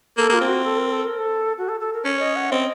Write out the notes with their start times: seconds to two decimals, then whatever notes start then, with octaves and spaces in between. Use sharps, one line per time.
0.17 A#3 A4
0.29 A#3 F4
0.41 C4
0.48 F#4
0.64 A4
0.78 A#4
0.91 A4
1.05 A#4
1.18 A4
1.58 F#4
1.69 A4
1.80 A4
1.93 A#4
2.05 C#4 C#5
2.19 D#5
2.36 F#5
2.52 C4 D#5